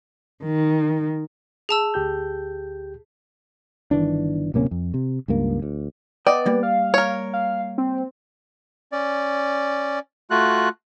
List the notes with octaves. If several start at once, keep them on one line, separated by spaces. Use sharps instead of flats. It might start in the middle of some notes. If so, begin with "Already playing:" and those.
D#3
G#4 A5 E6
D2 G4 G6
G1 D#3 E3 D4
D1 C3 A#3 C#4
F2
C3
C#2 G2 A#3
D2
B3 D5 D#5 G5
G3 A#3
F5
A#4 C#5
F5
C4
C#4 D5
A3 F4 F#4 F#6